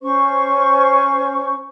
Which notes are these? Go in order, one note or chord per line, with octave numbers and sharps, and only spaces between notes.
C#4 C5 C#6